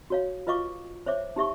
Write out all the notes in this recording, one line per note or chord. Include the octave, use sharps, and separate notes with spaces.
F#4 C#5 F5
F4 B4 D#5 F5 C#6 D6
C5 C#5 E5 D6
D#4 G4 E5 C#6